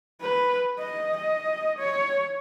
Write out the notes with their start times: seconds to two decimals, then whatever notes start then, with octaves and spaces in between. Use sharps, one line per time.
0.22 B4
0.79 D#5
1.17 D#5
1.79 C#5